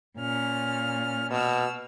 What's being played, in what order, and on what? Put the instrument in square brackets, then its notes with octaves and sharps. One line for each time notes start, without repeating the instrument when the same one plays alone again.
[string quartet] A#2 C#4 F6
[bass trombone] B2 [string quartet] E6 F6